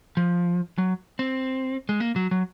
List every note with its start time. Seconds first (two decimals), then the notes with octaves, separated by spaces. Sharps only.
0.17 F3
0.78 F#3
1.19 C4
1.89 G#3
2.00 A#3
2.16 F#3
2.31 F#3